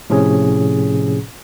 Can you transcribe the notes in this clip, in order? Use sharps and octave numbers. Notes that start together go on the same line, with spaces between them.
A2 C3 F3 C#4 G#4